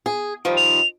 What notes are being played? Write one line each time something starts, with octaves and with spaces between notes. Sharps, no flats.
G#4
D#3 F3 G3
F7